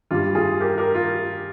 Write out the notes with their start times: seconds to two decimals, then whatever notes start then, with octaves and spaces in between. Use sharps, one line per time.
0.11 G2 G3 F4
0.35 F4 G#4
0.60 G4 A#4
0.78 G4 A#4
0.95 F4